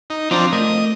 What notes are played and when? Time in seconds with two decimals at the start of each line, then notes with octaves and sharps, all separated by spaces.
0.10 D#4
0.31 F3 C4 D4 F4 A#5
0.53 A3 A#4 D#5